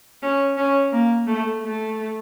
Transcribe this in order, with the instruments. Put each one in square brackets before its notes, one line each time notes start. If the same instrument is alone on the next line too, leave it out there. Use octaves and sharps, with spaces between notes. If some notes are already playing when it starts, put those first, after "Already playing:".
[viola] C#4
C#4
A#3
A3
A3